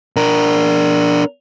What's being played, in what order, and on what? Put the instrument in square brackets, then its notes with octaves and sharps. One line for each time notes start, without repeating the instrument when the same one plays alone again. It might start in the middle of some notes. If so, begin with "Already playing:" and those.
[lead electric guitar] D4 A#4